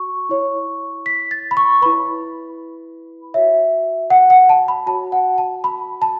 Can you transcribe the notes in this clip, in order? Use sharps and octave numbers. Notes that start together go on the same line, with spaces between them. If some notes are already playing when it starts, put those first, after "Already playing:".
Already playing: F#4 C#6
E4 C#5
B6
A6
B5
C#6
E4 B4 B5
F#4 C#5 E5
F#5
F#5
A5
B5
F#4 C#5 A5
F#5
A5
B5
A5